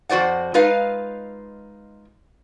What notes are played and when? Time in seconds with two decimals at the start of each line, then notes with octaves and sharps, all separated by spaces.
0.09 F2 F#4 C5 D5 F#5
0.54 G#3 D#4 F4 B4 F5